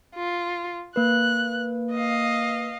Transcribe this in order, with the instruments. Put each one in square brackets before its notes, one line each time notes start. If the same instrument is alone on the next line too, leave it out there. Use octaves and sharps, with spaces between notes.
[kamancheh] F4
[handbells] A#3 B4 [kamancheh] F#6
[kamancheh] D#5 F5